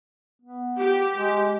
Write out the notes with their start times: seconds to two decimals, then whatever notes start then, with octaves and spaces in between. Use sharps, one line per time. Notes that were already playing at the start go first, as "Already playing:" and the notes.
0.42 B3
0.79 G4
1.18 G#3